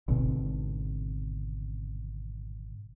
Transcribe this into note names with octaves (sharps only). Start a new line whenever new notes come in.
G#1 B2 D3 C4